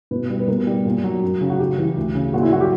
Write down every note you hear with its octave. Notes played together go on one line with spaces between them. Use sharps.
B2 B4
G3
B4
B2 A#4
G3
A#2
F#3
F#2
C#3
F#4
C#3 G4
E3
D2
C#3
A#2 F#4
E4
F#3 F#4
G4